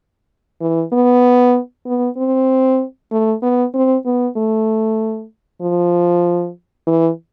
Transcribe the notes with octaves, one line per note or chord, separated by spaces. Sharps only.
E3
B3
B3
C4
A3
B3
C4
B3
A3
F3
E3